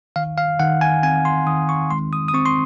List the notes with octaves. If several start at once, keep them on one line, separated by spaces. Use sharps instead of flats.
D#3 F5
F5
D#3 F#5
G#5
C4 G#5
C6
D#3 D#6
C#6
G#3 C6
D#6
D#6
C4 C#6
C6